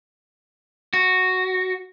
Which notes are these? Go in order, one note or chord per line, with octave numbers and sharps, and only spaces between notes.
F#4